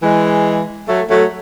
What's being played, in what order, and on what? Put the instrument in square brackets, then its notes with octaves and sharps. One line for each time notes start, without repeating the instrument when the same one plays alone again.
[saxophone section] E3 G#3
F#3 A3
F#3 A3